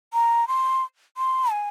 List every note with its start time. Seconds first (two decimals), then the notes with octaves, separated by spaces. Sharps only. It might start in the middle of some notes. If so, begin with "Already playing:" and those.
0.13 A#5
0.48 C6
1.17 C6
1.51 G#5